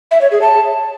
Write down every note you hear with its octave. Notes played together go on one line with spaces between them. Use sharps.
E5
C#5
G#4
A5